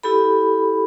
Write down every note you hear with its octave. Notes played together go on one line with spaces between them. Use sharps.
E4 G4 A4 B5